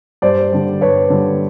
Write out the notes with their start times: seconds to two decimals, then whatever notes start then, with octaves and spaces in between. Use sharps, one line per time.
0.22 G2 C5 D5
0.52 D3 G3
0.81 G2 B4 C#5
1.10 D3 G3